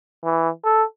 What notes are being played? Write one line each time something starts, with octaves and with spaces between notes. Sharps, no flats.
E3
A4